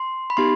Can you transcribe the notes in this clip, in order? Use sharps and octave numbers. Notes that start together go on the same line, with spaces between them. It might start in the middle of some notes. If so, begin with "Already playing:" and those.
Already playing: C6
B5
B3 D#4 G4 C6